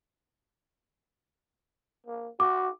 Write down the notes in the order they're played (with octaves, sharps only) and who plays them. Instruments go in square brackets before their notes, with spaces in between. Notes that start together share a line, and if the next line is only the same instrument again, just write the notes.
[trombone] A#3
[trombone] F#4 [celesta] D6